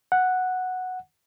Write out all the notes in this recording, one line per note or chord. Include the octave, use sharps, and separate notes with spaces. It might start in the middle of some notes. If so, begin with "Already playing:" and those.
F#5